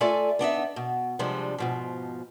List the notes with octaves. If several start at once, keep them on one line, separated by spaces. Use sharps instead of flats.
A3 F4 A4 D5 E5 G#5
B3 D4 D#4 E5
B2
C3 F3 G3 G#3 D4
G#2 B2 F3